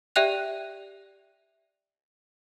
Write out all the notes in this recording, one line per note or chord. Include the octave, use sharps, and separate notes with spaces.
G4 D5 E5 G5 F#6 F7